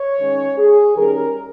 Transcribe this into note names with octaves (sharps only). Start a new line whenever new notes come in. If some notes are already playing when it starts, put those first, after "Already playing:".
Already playing: C#5
D#3 G#3 C#4
G#4
D#3 G3 C#4 A#4